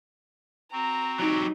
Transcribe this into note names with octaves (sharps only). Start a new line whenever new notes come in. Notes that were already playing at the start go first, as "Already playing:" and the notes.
C4 F#4 A#5
F#3 D#4 G4